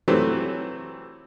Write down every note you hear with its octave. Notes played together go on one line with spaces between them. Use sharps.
C3 E3 F#3 A3 C4